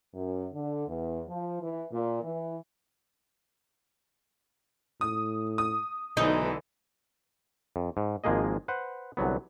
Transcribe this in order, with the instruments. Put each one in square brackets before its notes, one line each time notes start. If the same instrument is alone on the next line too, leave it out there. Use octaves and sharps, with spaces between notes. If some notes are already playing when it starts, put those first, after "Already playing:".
[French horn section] F#2
D3
E2
F3
E3
A#2
E3
[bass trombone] A2 [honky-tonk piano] D#6
[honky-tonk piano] D#6
[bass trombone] B1 [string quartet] D3 E3 G#3 [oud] D#4
[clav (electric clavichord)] F2
G#2
G#1 F3 G#3 A#3 G#4 D#5
B4 C5 F#5
C2 D3 F#3 B3